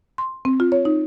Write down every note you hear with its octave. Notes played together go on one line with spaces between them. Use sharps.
C6
C4
F4
C#5
D#4